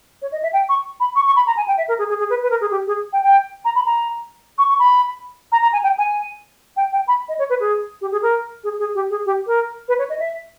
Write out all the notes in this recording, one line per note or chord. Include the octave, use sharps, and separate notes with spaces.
C#5
D#5
E5
G5
C#6
B5
C#6
C#6
B5
A#5
G#5
G5
E5
A#4
G#4
G#4
G#4
B4
B4
A#4
G#4
G4
G#4
G5
G5
A#5
B5
A#5
C#6
C#6
B5
A#5
A#5
G#5
G5
G#5
G5
G5
B5
D#5
C#5
B4
G#4
G4
G#4
A#4
G#4
G#4
G4
G#4
G4
A#4
B4
C#5
D#5
E5